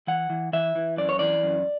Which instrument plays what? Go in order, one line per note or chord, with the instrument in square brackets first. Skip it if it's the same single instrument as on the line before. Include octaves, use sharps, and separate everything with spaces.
[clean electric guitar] E3 F#5
E3
E3 E5
E3
F#2 D5
C#5
E3 D5
F#2